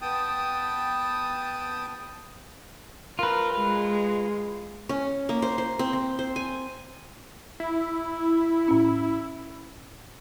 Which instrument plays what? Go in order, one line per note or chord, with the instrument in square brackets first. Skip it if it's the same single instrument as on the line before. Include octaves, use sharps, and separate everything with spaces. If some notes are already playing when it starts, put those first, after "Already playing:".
[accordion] B3 G5 A5 D#6
[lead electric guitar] F4 B4 [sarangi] A#4
[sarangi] G#3
[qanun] C#4
A#3
C5
C5
C4
C4
C5
G#5
[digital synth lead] E4
[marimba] A2 C#4